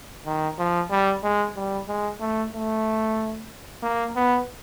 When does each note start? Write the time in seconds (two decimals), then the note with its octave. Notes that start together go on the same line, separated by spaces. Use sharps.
0.26 D#3
0.58 F3
0.91 G3
1.24 G#3
1.56 G3
1.88 G#3
2.20 A3
2.53 A3
3.83 A#3
4.16 B3